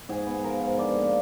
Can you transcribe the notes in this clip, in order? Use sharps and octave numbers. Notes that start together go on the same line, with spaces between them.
G#2 G#4
B3
F3 A#4
G#2
D3 D5
A#3